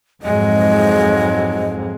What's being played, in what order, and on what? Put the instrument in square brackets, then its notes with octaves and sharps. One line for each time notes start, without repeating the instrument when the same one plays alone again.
[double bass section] F2 G#2 [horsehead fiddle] F#3 G#3 [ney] D#5